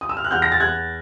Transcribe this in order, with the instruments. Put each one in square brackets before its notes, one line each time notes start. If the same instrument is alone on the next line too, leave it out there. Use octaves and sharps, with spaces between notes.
[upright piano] D#6
E6
F6
F#6
E2 F6 G6
A#6
A6
E2 F#6 G#6